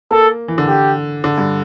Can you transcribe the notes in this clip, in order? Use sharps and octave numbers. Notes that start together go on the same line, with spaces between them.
A#3 A4
E3
D3
G4
D3
G2